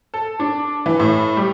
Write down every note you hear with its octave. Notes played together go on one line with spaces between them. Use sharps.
A4
D4
E3
A2
G3